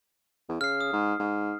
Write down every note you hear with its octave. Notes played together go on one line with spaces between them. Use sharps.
E2
C#3 F6 C7
D#6
G#2
G#2